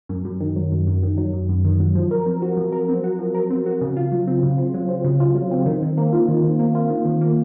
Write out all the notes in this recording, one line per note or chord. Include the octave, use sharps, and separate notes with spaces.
F#2
F#2
D#3
F#3
F#2
F#2
D#3
F#3
F#2
F#2
D#3
F#3
F3
A#4
C4
F#4
F3
A#4
C4
F#4
F3
A#4
C4
F#4
C#3
F4
F#3
C4
C#3
F4
F#3
C4
C#3
F4
F#3
C4
D#3
D#3
A#3
F4
D#3
D#3
A#3
F4
D#3
D#3
A#3